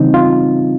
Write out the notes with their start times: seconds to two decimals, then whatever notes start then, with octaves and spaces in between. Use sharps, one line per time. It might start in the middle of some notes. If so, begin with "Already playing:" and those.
Already playing: C#3 E3 G3 C4 D#4
0.14 F4